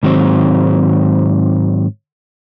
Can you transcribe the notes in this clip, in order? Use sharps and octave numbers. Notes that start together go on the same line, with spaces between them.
G#2 D#3 F#3 C4